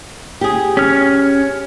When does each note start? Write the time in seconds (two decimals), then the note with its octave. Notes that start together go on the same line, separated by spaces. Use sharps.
0.41 G4 G#4
0.77 C#4 F6